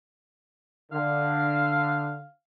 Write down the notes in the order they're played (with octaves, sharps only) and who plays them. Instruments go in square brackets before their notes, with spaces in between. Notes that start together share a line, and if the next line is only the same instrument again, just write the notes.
[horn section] D3 [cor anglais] F5